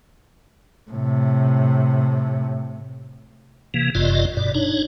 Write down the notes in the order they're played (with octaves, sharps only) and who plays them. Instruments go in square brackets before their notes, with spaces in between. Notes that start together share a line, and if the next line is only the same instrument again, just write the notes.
[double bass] A2 C3
[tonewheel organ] C3 E3 A#3
F#1 F#2 C3 F4 D5 D#5
G2 B2 D5
D4 D#4 C#5